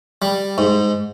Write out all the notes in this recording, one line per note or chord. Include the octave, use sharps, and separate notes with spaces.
G3
G#2